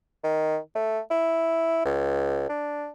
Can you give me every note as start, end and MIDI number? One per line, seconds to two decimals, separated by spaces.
0.24 0.58 51
0.75 1.00 57
1.11 1.85 64
1.85 2.49 37
2.50 2.90 62